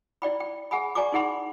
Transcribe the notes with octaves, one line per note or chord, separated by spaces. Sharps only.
E4 D5 G5 B5
G5
G#4 F#5 G#5 B5
D5 G#5 A#5 C#6 D6
D#4 E4 G#4 F#5 B5 C6